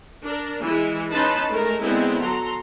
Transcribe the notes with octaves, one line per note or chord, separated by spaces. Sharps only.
D4 A#4
E3 G#3 E4
C#4 D#4 B4 A5 B5 C6
G#3 A3 A#4
D3 G#3 B3 C4 E4
F#3 A4 A#5 C6